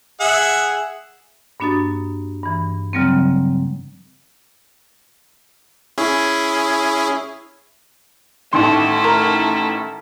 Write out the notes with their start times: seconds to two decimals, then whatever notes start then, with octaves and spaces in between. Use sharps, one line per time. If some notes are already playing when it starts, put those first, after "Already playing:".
0.20 G#4 E5 F#5
1.60 G2 A#3 D4 F#4 D#6 A6
2.43 G2 E3
2.93 C#3 F#3 G3 A#3 C4
5.98 C#4 E4 G#4
8.53 A1 D#3 A3 E4 C6
9.04 A#4